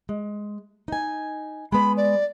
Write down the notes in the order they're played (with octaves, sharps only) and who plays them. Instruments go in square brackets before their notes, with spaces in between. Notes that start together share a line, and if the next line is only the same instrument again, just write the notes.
[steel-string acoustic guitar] G#3
D#4 G#5
[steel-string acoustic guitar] G#3 B3 [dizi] B5
[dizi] D5